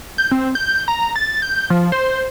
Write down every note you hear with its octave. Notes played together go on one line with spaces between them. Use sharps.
G6
C4
G6
A#5
A6
G6
F3
C5